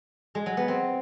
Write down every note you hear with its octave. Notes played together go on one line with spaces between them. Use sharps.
G#3
F#3
B3
C4